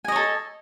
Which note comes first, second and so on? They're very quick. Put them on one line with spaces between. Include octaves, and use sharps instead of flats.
G#5 D#5 C#5 A4